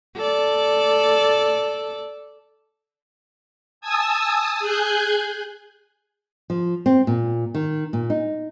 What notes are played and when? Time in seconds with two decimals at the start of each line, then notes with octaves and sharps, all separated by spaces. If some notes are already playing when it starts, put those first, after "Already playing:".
0.17 A4 D5
3.81 G#5 A5 D#6 E6 G#6
4.59 G#4 G#5 F#6 G6
6.50 F3
6.86 C4
7.07 A#2
7.54 D#3
7.93 A#2
8.10 D#4